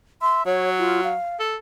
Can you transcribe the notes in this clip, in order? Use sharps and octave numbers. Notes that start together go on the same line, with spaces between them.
E5 C6
F#3 C#5
F4
F5
A4